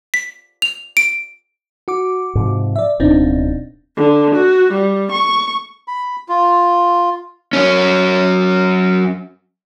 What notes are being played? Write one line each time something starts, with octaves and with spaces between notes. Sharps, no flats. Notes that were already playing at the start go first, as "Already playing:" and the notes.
B6
F7
D7
F#4 D6
G#2 C3 F3
D5 E5
D1 B2 C4 D4 D#4
D3
F#4
G3
C#6
B5
F4
F#3 C#4